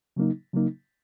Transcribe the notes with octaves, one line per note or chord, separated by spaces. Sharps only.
C#3 F#3 A#3 D#4
C#3 F#3 A#3 D#4